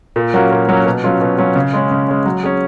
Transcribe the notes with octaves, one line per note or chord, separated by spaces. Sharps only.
A#2
F#3 A#3 C#4 F#4
A#2
F#3 A#3 C#4 F#4
B2
F#3 C#4 F4
B2
F#3 C#4 F4
C#3
G#3 C#4
C#3
G#3 C#4
F#3
C#4 G#4